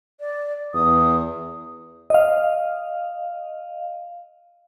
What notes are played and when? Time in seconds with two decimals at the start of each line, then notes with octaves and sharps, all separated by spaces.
0.20 D5
0.74 E2 D#6
2.10 D#5 F5